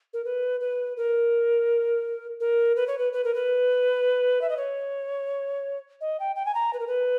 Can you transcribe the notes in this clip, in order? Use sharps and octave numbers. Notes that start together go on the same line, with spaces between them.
A#4
B4
B4
A#4
A#4
B4
C#5
B4
B4
A#4
B4
E5
D#5
C#5
D#5
G5
G5
G#5
A#5
B4
A#4
B4